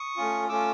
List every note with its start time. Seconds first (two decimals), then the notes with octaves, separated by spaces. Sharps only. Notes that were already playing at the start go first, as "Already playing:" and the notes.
Already playing: C#6 D#6
0.17 A3 C#4 F4
0.49 A3 C#4 F4 D6 E6